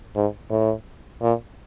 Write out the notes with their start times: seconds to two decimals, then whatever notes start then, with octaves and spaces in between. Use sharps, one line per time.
0.16 G#2
0.51 A2
1.22 A#2